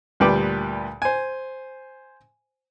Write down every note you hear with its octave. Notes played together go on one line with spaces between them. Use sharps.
D2 A#2 G3 B4 G5 D6
C5 G#5